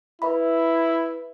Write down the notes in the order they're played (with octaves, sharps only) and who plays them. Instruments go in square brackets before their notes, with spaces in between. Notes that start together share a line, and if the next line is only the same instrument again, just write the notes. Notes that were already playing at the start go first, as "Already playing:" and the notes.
[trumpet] E4 [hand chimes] B4 E5 B5